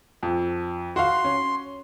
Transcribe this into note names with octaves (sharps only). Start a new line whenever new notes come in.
F2
F#4 F5 C6
C#4